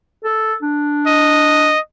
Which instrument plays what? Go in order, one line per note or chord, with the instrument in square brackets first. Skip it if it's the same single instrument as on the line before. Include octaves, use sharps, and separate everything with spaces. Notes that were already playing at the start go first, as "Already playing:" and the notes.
[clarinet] A4
D4
[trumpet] D#5